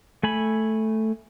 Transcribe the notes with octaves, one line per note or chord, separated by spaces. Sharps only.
A3 G#5 B5